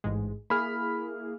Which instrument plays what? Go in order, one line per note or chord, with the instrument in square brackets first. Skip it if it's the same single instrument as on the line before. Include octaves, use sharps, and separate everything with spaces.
[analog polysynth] A1 G#2 G#3
[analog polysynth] A#3 E4 G#4 [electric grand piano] B5 F6